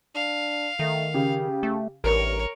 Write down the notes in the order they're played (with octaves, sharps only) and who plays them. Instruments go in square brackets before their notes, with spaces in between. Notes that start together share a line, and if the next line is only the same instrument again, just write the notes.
[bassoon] D4 [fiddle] F5
[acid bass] D#3 [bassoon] A3
[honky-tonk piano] C#3 [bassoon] G4
[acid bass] A3
[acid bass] A1 [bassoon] G2 [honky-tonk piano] A#4 [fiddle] C#5